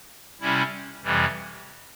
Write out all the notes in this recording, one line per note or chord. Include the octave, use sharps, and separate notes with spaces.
C3 G3 C#4 E4
F2 C3 E3 G3